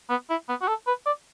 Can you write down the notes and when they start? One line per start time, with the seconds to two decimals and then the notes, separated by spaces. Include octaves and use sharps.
0.10 B3
0.30 E4
0.49 B3
0.61 F#4
0.68 A4
0.87 B4
1.06 D5